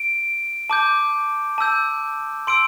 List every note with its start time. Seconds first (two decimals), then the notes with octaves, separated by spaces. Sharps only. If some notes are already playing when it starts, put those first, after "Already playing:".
Already playing: D7
0.70 A5 D6 G6
1.58 A5 E6 G6
2.47 C6 E6 D7